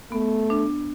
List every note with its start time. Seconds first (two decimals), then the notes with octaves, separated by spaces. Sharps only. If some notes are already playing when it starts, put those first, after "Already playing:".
0.12 A3 B3
0.50 D4